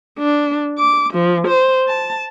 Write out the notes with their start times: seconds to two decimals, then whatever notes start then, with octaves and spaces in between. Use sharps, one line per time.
0.19 D4
0.79 D6
1.13 F3
1.48 C5
1.88 A5